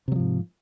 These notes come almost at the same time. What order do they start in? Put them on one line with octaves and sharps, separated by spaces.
C3 F#3 F3 G#2